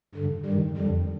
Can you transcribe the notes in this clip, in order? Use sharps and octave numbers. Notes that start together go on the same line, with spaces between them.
G2 D3
G2 D#3 G3
F2 D3 G3